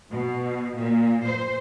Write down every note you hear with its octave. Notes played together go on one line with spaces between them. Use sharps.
B2
A#2
C5